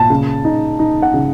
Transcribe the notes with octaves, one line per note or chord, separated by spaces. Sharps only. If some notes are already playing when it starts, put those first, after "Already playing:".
Already playing: A#2 A5
C#3
D#4
D#4
F#5
C#3